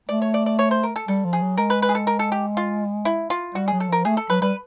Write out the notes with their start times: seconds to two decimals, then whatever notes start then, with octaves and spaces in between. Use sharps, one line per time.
0.09 A3 D5
0.22 C#5
0.34 D5
0.46 D5
0.59 C#5
0.71 C5
0.83 A#4
0.96 A4
1.08 G3 A4
1.25 F3
1.33 G#4
1.42 F#3
1.57 G#3 A#4
1.70 B4
1.82 B4
1.89 G#4
1.95 A4
2.07 A#4
2.19 A4
2.32 G4
2.57 F4
3.05 E4
3.30 F4
3.55 G3 F#4
3.68 F#3 G#4
3.80 A4
3.88 F3 A#4
4.05 A3 G#4
4.17 A4
4.30 F#3 B4
4.41 G3 B4